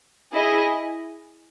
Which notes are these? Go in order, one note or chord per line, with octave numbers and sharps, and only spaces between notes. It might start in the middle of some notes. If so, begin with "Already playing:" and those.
E4 G#4 D#5